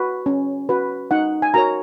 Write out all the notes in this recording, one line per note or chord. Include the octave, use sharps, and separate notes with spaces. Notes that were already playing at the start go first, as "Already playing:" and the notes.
Already playing: F#4 B4
C#4
F#4 B4
D#4 F#5
G#5
F#4 A#4 C#5 A#5